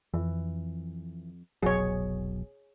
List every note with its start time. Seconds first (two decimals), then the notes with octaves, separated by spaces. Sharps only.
0.14 F2 E3
1.63 F1 C2 B2 F#3 G#4 C#5